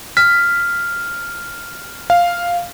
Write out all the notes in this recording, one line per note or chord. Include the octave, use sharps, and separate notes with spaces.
F6 B6
F5